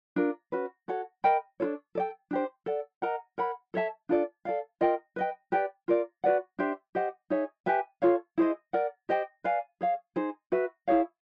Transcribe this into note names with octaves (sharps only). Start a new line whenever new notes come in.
D4 F4 A#4
C#4 F#4 B4
F#4 A4 C#5 F#5
A#4 D#5 G5 B5
D4 F4 A4 C#5
A4 D5 G5
D4 G4 C5
A4 D5 F#5
A#4 D#5 F#5 A#5
A#4 C#5 F#5 B5
A4 C#5 E5 A5
D4 F4 A4 D5
A4 D5 F5
F4 A#4 D#5 G5
B4 D#5 G5
G4 B4 D5 G5
F4 A#4 D5
F#4 B4 D5 F#5
D4 G4 C5 E5
G4 C5 D#5 F#5
D#4 G#4 C#5 E5
G4 B4 E5 G#5
F4 A4 C#5 F5
E4 G#4 C5 D#5
A#4 D5 F#5
G4 C5 D#5 G5
B4 D5 F5 G#5
G#4 C#5 F5
D#4 G#4 C5
F#4 B4 E5
E4 G#4 C#5 F5